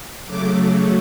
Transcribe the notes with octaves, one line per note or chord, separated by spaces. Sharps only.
C#3 F#3 A3 D6